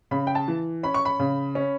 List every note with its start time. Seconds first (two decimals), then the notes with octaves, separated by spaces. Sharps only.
0.11 C#3 B5
0.27 G5
0.35 A5
0.48 E3
0.83 C#4 B5
0.94 C#6
1.05 B5
1.19 C#3
1.55 C#4